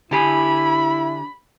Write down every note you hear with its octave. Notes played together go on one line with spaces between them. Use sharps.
D3 E4 G4 G#5 B5